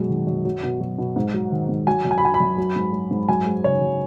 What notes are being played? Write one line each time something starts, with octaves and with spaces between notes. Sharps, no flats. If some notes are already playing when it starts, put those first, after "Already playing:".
Already playing: F#2 B2 G#3
D#3
F#2
F#3
B2
F#3
B2
G#2
F#3
D#3
G#2
F#3 G#5
F#2
G#5
B5
F#3 G#5
B5
F#2
F#3
G#2
F#3
G#2
F#2 G#5
G#3
C#3 C#5
F#2